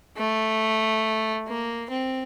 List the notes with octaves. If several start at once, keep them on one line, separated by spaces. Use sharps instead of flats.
A3
A#3
C4